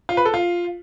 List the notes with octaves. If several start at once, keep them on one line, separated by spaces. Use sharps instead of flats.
F4
B4
A4
F4